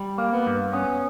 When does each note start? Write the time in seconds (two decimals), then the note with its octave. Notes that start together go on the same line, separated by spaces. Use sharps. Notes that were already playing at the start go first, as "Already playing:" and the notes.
Already playing: G3
0.18 A#3
0.33 B3
0.46 G2
0.73 B3 C#4